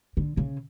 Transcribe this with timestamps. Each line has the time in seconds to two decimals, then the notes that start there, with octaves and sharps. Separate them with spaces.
0.17 D3
0.37 C#3